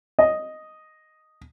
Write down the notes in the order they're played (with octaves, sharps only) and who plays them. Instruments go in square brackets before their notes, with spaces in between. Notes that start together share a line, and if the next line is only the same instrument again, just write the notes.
[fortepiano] D#5